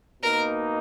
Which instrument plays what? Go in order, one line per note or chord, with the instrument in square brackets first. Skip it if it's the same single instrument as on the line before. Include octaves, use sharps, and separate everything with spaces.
[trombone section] B2 A#3 D#4 [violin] A#4